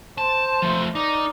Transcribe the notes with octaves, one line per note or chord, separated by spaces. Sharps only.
C5 A5
F3 A3
D#4 A#4 D5